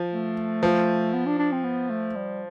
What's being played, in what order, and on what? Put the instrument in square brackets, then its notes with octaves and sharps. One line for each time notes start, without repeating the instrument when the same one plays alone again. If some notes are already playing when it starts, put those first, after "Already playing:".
Already playing: [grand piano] F3
[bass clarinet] A3
[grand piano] F3
[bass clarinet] B3
D4
D4
C4
B3
A3
G3